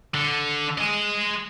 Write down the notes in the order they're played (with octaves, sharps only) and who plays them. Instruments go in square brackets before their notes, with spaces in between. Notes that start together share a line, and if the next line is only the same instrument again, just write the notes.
[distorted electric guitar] D3
G#3 D#5